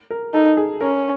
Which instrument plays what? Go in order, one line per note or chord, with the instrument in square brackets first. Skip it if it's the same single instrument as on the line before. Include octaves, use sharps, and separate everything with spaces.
[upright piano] A#4
[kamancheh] D#4 [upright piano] A4
[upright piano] G#4
[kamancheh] C#4 [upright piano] A#4